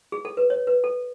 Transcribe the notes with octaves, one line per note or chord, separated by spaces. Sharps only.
G#4
A4
B4
C#5
B4
A4